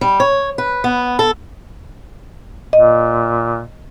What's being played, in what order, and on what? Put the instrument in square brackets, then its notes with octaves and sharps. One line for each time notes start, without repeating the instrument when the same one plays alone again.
[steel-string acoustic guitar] G3
C#5
B4
B3
A4
[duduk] A#2 [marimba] D#5